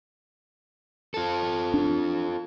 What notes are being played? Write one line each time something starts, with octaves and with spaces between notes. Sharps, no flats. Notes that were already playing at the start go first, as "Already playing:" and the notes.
F4 A4
D4